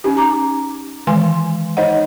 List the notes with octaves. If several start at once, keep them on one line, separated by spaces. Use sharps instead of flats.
C#4 D#4 G4
A#5 D6
D#3 E3 G#3 G#5 C6
D#4 C5 C#5 D#5 F#5